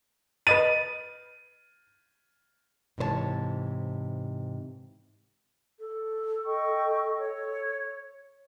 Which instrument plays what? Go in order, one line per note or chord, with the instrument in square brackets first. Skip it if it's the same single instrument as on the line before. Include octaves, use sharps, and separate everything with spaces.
[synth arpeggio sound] B4 D#5 A6 [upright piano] D#7
[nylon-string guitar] G#2 C3 E3 C5 C#5 A5
[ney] A4
[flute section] D#5 G5 C#6
C#5